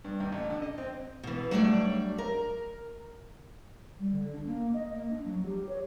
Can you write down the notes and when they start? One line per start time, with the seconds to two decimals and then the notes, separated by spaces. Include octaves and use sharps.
0.05 G2
0.20 D#2
0.32 A1
0.50 D3
0.62 D#5
0.78 C4
1.23 B2 E3
1.51 F#3 G3 A3 D4 C#5 D5
2.18 A#4
3.99 G3
4.12 D3
4.33 D4
4.46 A#3
4.74 D#5
4.92 A#3
5.11 D4
5.25 F#3
5.46 G4
5.69 C#5